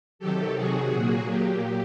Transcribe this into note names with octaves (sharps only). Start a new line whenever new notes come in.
C3 D#3 F#3 G4 A4
F#4 G#4
A#2 F#3 A#3
G4